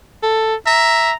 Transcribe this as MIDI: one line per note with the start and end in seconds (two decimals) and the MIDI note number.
0.23 0.55 69
0.66 1.11 76
0.66 1.14 82